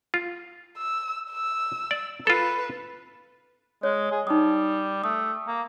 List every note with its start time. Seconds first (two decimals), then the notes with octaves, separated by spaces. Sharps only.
0.14 F4
0.77 E6
1.31 E6
1.91 D5
2.27 F4 A4 B4
3.83 G#3 C#5
4.12 G#4
4.27 G3 D#4 D#6
5.04 A3 D#6
5.48 A#3